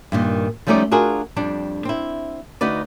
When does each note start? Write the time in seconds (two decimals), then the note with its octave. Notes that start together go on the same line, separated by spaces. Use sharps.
0.12 G2 A#2 D#3
0.67 F3 G3 A3 C#4 D#4 D5
0.91 D4 F4 F#4 G#4 A#4
1.36 F2 G3 D4
1.85 C4 E4
2.61 D2 D#4 F#4 B4 D5